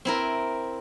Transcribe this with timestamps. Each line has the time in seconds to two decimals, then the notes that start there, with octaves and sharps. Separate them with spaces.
0.05 C4 E4 A#4